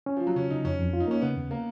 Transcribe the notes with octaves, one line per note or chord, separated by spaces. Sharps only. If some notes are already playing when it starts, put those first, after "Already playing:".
C#4
F3
F4
F#3
C#3 C#4
C#3 D#4
F2 C#4
F2
F4
D#4
A#3 C#4
C#3 B3
D#2
A#3